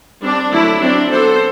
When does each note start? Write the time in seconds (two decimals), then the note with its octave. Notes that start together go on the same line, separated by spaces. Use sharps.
0.22 G3 C4 D4
0.52 D3 F#3 A3 D4 E4
0.82 F#3 C4 D4
1.12 F#3 B3 D4 A4 C5